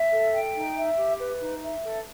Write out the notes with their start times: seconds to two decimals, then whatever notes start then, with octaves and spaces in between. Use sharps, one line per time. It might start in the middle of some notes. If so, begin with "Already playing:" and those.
Already playing: E5
0.11 A4
0.33 G5
0.55 D#4
0.76 E5
0.97 G4
1.19 B4
1.40 D#4
1.62 E5
1.84 A4